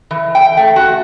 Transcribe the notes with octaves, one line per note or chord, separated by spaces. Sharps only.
E3
G5
A3
F#4